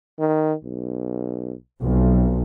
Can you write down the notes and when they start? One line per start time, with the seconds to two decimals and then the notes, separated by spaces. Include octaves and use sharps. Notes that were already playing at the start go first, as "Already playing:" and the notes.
0.20 D#3
0.64 B1
1.81 B1 F2